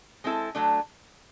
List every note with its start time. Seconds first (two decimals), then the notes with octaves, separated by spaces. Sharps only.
0.24 G#3 C4 E4 A4
0.55 F#3 A3 D4